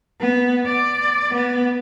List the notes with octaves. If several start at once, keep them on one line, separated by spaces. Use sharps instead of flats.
B3
D5
B3